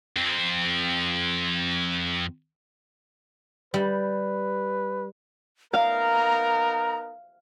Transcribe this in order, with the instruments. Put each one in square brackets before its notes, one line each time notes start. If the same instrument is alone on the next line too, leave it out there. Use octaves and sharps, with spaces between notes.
[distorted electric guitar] F2 C4
[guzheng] G3 [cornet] B4
[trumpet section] B3 D#4 A#4 [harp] F5 [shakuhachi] A#5